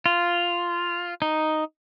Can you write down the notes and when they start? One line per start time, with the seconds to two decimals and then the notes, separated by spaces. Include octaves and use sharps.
0.06 F4
1.22 D#4